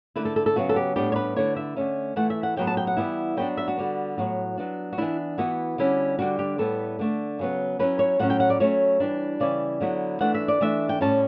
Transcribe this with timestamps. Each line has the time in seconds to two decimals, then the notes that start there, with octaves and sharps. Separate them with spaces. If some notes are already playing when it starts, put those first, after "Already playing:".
0.16 D3 A3 E4 B4
0.25 A4
0.36 A4
0.46 A4
0.56 C#3 F#3 B3 E4 F#4
0.69 A4
0.76 G4
0.96 A2 G3 B3 D4 G4
1.12 C#5
1.16 B4
1.36 D3 A3 E4 C#5
1.56 E5
1.76 D3 A3 C#4
2.16 E3 A3 E4 F#5
2.30 E5
2.43 F#5
2.56 A2 F#3 B3 G5
2.67 A5
2.77 G5
2.87 F#5
2.97 E3 G3 B3 E4
3.37 F#3 B3 D4 G5
3.57 E5
3.68 F#4
3.77 D3 G3 B3
4.18 A2 F#3 B3 F#4
4.57 F#3 B3 D4
4.93 F#4
4.98 E3 B3 D4 E4
5.38 E3 B3 E4 F#4
5.78 D3 G3 C#4 E4
6.19 D3 G3 D4 F#4
6.39 G4
6.58 A2 G3 B3 E4 A4
6.99 D3 A3 D4
7.39 C#3 F#3 B3
7.79 F#3 C#4 E4 B4
7.99 C#5
8.19 A2 F#3 C#4 F#5
8.30 G5
8.40 F#5
8.50 D5
8.60 F#3 A3 C#4 C#5
9.00 E3 G3 D4
9.40 C#3 E3 G3 C#4 E4 D5
9.80 D3 F#3 B3 E4
10.21 E3 A3 D4 F#5
10.34 E5
10.48 D5
10.61 E3 A3 D4 E5
10.89 G5
11.01 A2 G3 C#4 A5